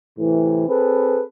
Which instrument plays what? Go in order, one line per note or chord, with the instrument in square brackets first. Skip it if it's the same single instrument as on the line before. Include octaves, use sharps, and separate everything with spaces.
[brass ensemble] A2 C3 E3
C4 G#4 A4 B4